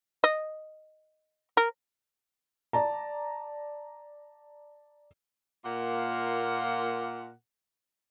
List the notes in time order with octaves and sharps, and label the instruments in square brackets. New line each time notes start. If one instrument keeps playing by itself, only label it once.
[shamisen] D#5
A#4
[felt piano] D5 A5 A#5
[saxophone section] A#2 A#3 F4 A#4 F#5